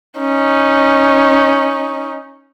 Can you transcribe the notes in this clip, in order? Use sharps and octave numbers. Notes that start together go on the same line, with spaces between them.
C#4 D#4